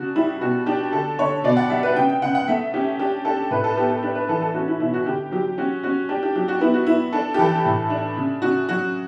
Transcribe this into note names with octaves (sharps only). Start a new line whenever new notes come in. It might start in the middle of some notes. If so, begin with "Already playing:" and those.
Already playing: C#3 D4 F#4
G3 E4
B2 F#4
D4 G4
D3 A4
D3 C#5
B2 D5
F#5
G3 E5
B4
C#3 G5
G5
C#3 F#5
F#5
A3 E5
C#4 G4
D4 G4
D4 A4
A2 B4
A4
B3 G4
A4
D4 B4
B4
E3 A4
A4
C#4 F#4
E4
B2 E4
F#4
D3 G4
F#3 G4
C#4 F#4
C#4 F#4
D4 G4
G4
F#3 G4
F#4
B3 E4
F#4
B3 E4
D4 A4
G4
E3 A4
A2
D4
C#3
C#3 F#4
F#3 F#4